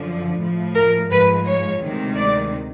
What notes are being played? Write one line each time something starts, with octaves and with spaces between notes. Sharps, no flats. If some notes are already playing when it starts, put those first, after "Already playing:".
Already playing: F#2 D3 F3
A2 F3 A3
A#4
G#2 F3 G#3 B4
C#5
D2 C3 D#3 G#3
D5